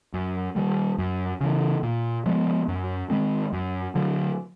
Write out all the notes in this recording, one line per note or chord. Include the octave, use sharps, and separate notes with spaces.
F#2
D#3 G3
F#2
C#3 E3
A#2
F3 G#3 B3
F#2
D#3 G#3 C4
F#2
D3 F#3